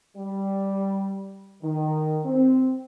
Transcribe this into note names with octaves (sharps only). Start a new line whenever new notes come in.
G3
D#3
C4